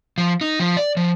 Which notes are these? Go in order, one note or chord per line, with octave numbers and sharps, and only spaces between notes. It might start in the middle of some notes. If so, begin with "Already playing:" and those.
F3
D#4
F3
D5
F3